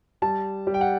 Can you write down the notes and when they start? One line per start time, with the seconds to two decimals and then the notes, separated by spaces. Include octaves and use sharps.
0.22 G3 A5
0.67 G3
0.74 G5
0.81 F#5